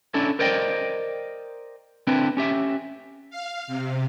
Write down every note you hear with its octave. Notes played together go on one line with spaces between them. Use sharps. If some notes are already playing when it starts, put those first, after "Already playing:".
C#4 D4 E4 A4
A#4 C5 D5 D#5 G5
D3 C4 D4 E4 B4
C#4 G4 E5
F5
C3